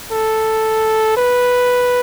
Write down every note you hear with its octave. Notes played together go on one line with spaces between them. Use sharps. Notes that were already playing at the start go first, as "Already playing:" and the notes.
A4
B4